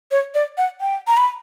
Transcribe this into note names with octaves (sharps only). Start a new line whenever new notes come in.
C#5
D5
F#5
G5
A#5
B5